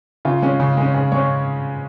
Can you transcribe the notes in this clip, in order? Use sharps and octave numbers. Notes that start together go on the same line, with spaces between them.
C#3 F4
G#3 C#4
C#3
G#3 C#4
C#3 G#4
G#3 C#4 C#5